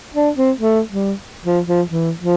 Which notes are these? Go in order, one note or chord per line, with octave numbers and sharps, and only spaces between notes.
D4
C4
A3
G3
F3
F3
E3
F3